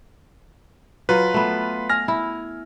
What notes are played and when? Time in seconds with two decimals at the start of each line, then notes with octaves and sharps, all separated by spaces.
1.09 F#3 F4 B4
1.34 A3 B3
1.89 G#5 F6 A#6
2.08 E4